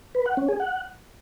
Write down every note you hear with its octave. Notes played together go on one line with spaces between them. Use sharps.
B4
F#5
C#4
G#4
F#5